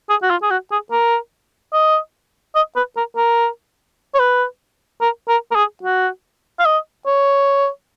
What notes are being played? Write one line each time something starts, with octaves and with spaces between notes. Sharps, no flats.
G#4
F#4
F4
G#4
F#4
G#4
A#4
D#5
D#5
B4
A#4
A#4
C#5
B4
A#4
A#4
A#4
G#4
F#4
F5
D#5
C#5